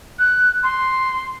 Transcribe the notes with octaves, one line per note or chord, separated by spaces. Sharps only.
F#6
C6